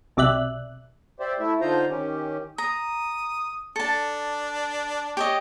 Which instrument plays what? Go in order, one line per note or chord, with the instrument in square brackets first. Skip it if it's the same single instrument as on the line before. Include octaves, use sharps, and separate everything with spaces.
[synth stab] B1 C3 D5 E5 F#6
[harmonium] G4 C5 D5 E5
A3 E4 E5
D3 D#4 F4 C5 A#5
D#3 C#4 G4
[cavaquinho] A#5 [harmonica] D#6
[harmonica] D4 [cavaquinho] A4 A5
[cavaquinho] G4 C#5 D#5